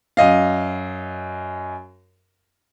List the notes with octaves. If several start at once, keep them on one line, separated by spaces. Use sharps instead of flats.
F#2 D#5 F5